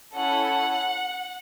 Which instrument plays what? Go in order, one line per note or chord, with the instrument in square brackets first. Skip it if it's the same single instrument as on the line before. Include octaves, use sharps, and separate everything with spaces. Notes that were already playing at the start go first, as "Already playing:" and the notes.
[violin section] C#4 E4 A4 F#5